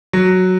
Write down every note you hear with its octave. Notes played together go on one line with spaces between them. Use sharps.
F#3